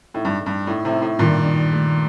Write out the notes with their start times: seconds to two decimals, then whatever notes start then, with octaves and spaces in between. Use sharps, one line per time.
0.14 A2 D#4
0.25 G2
0.41 A3
0.46 G2
0.67 A2 D#4
0.85 A2 C3
0.93 D#4
1.02 A2
1.19 G2 A#2 D#3
1.46 D#4
1.72 A3